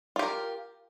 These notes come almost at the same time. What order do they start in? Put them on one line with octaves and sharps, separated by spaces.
F4 G4 A#4